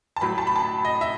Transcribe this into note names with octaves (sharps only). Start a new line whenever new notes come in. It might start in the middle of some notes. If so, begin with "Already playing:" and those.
A5
A2 F#3 B5
A5
B5
A5
D#5
E5